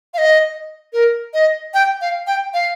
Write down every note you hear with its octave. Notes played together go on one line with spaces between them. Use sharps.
F5
D#5
A#4
D#5
G5
F5
G5
F5